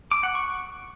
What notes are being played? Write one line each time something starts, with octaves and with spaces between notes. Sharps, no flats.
D6
F#5
C#6